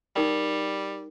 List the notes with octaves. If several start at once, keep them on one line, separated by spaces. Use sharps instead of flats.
G3 D#4 A#4 G5